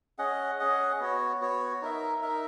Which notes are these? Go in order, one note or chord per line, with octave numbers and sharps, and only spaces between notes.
C#4 G#4 D#5 F#5
C#4 G#4 D#5 F#5
B3 F#4 C#5
B3 F#4 C#5
D#4 A#4 E5
D#4 A#4 E5